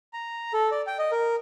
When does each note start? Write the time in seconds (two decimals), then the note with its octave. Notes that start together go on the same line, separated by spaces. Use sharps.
0.13 A#5
0.53 A4
0.71 D5
0.87 G5
0.99 D#5
1.11 A#4